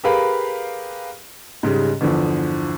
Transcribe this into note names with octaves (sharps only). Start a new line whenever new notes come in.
G4 G#4 A#4 B4 F5 B5
G#2 C#3 G3 G#3
G1 E2 D3 F3